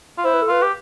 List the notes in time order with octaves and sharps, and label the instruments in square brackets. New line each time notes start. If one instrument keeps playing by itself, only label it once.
[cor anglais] F4
[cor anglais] E4 [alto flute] C5
[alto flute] B4
A4
[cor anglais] F4 [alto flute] B4
[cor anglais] G4